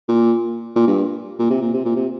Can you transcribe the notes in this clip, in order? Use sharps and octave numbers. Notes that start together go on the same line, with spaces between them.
A#2
A#2
G2
A#2
C3
A#2
C3
A#2
C3